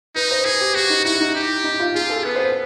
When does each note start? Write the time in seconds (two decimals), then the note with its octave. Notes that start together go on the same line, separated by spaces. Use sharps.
0.15 D#4 B4
0.31 C5
0.45 G#4 B4
0.61 G4
0.75 F#4 G4
0.90 D#4
1.05 E4 F#4
1.21 D#4
1.35 G4
1.64 D#4
1.80 F4
1.94 F4 G#4
2.09 A4
2.25 B3 B4
2.35 C5
2.40 B4